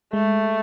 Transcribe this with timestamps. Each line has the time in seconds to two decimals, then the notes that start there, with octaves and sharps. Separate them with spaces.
0.13 G#3 A3